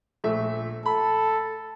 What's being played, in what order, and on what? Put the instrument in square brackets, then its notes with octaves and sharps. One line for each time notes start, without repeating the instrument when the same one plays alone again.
[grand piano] A#1 A3 E5
[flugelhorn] A4 [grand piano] B5